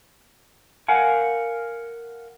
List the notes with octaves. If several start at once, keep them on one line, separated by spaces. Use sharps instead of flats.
A#4 F5 F#5 G#5